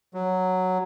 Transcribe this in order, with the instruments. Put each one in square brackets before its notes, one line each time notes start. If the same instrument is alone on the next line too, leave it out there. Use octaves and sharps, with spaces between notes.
[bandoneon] F#3